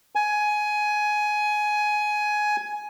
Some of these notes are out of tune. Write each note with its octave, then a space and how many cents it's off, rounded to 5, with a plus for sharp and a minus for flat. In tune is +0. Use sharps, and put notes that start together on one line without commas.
G#5 +15